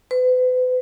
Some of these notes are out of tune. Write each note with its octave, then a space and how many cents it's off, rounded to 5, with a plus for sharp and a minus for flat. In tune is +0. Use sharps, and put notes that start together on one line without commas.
B4 +40